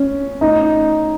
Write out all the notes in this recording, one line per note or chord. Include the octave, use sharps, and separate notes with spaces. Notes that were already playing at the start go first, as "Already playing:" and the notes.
Already playing: C#4
D#4